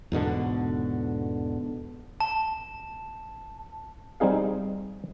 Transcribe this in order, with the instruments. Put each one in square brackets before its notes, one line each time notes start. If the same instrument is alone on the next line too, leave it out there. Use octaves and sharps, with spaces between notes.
[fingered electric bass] E2 G#2 B2 D3
[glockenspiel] A5
[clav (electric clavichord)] G3 C4 D#4 G#4 F5